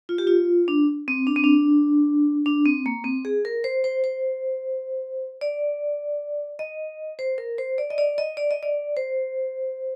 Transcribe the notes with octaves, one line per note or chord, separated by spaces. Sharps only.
F4
G4
F4
D4
C4
D4
C4
D4
D4
C4
A#3
C4
G#4
A#4
C5
C5
C5
D5
D#5
C5
A#4
C5
D5
D#5
D5
D#5
D5
D#5
D5
C5